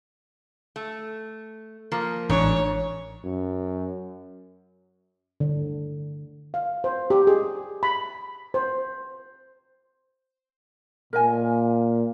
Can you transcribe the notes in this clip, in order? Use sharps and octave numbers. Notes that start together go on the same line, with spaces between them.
A3
F3 A#3
A1 G#2 D4 C#5
F#2
D3
F5
C5
G4
G#4
B5
C5
A#2 A#4 D#5 G#5